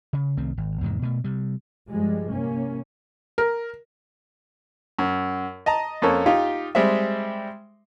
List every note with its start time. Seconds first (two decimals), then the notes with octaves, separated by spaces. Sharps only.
0.13 C#3
0.37 C2 D#3 A3 C4
0.58 G#1
0.81 E2 G#2 C3 D#3
1.02 B2 A3
1.24 C3 G3
1.89 G2 F3 G3 G#3
2.31 C3 A#3 C#4
3.38 A#4
4.99 F#2
5.66 D#5 A5 A#5
6.02 F2 A#3 C#4 A4
6.26 D#4 F4 G4
6.75 G3 G#3 C4 E5